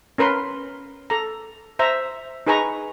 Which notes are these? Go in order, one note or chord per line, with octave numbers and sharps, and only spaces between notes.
C#4 A#4 B4 C6
A4 A#5
C5 E5 A#5
D#4 G#4 B4 G#5 A#5 C#6